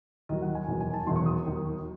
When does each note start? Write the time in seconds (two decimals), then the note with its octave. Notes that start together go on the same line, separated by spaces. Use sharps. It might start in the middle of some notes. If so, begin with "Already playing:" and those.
0.29 D#2 D#3 F#3 D#5
0.42 F#5
0.55 G#5
0.68 E1 E2 D#3 F#3
0.80 G#5
0.94 A5
1.06 E1 E2 D#3 F#3 C6
1.16 C#6
1.26 D#6
1.46 D#2 D#3 F#3